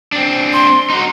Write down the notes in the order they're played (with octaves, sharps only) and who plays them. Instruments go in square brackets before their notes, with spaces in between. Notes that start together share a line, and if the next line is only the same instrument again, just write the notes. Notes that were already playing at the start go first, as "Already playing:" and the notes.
[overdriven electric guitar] C4 D4
[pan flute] C6
[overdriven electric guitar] D#4 F#4